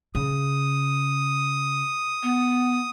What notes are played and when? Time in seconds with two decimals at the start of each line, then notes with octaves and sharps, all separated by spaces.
0.15 C#3 D#6
2.23 B3